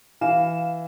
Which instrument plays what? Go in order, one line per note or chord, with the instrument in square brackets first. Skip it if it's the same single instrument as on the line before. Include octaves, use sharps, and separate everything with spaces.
[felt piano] E3 [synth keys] F5 E7